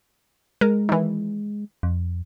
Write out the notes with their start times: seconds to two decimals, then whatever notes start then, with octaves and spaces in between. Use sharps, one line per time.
0.61 G#3 A#4
0.89 D#3 E3
1.83 F2